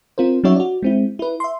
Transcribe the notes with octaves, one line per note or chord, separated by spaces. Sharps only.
C4 F4 A#4 C5
F#3 C#4 D#4 F#4 C#5 E5
F#4 D5
G#3 C4 E4
E4 B4
E5 C6